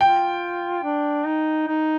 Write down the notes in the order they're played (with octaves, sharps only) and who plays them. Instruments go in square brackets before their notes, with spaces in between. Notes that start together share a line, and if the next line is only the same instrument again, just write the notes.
[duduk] F4 [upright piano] G5
[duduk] D4
D#4
D#4